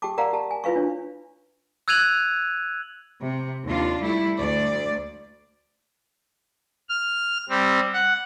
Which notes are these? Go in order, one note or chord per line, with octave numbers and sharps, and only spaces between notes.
G4 G5 A5 D6
A#4 D5 F5 F#5 A#5
G4 A5
G#5
E4 F4 B4 F5 C#6
D4 C#5
E6 F#6 G#6 D#7 F7 F#7
C3
D#2 D4 F4
G3 A3 E4
D2 D5
F6
G3 C4
F#5